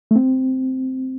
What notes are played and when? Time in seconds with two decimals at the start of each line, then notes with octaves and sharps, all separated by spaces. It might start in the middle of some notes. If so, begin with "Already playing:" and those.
0.11 A3
0.16 C4